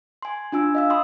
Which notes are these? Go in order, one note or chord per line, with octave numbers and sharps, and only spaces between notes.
G#5 C6
D4 F4 G#5 E6
D#5 F5 E6
B5 C6 D#6 E6